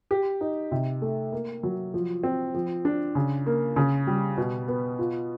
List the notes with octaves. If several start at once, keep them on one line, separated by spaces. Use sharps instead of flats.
G4
D#4
C3
A3
A#3
F#3
F3
C4
F3
D4
C#3
A#3
C#3
G3
B2
B3
F4